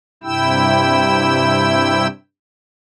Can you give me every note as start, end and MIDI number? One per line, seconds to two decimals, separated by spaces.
0.24 2.07 43
0.24 2.07 48
0.24 2.07 64
0.24 2.07 79
0.24 2.07 88